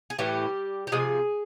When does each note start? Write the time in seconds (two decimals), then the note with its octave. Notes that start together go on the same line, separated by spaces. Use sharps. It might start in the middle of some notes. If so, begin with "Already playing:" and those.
0.10 G#4
0.19 A2 E3 G3 A3 G4
0.87 G4
0.92 C3 F3 G#3 G#4